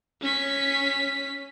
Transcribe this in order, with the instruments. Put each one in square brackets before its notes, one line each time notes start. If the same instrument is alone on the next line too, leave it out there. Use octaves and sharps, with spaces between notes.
[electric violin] C#4 B6